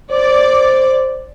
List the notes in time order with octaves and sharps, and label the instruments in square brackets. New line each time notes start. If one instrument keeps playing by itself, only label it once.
[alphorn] C5 [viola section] D5